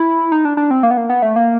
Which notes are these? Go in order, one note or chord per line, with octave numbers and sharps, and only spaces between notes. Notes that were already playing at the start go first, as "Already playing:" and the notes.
Already playing: E4
D#4
D4
D4
C4
A#3
B3
A#3
B3
A3
A#3